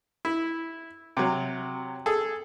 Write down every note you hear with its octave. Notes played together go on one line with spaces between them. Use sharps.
E4
C3 F#3
G#4 A4